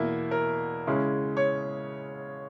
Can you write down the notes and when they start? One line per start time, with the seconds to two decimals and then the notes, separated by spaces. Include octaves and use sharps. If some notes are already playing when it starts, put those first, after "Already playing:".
Already playing: E2 B2 A#3 E4 E5
0.31 A#4
0.87 C#3 G#3 C#4 E4
1.37 C#5